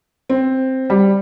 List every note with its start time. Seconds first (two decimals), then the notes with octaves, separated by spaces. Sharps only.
0.29 C4
0.90 G3